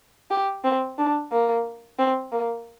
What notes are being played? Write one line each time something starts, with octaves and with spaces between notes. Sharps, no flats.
G4
C4
D4
A#3
C4
A#3